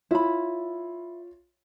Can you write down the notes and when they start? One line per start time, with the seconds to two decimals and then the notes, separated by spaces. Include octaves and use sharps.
0.11 E4 F4 C#5 B5